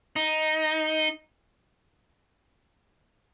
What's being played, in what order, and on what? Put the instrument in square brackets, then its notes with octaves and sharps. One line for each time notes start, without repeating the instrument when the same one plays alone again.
[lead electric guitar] D#4